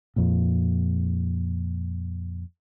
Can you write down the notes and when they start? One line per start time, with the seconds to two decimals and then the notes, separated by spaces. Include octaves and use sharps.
0.16 F2 A#2